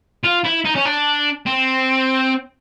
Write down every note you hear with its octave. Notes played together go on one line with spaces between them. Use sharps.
F4
E4
D#4
C#4
D4
C4